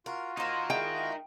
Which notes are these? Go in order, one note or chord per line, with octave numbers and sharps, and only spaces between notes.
F4 F#4 A#4
A#3 D#4 A#4 C5
G#3 E4 G5